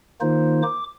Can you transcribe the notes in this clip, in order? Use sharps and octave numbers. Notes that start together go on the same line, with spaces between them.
D#3 A#3 D#4 F4 C5
D6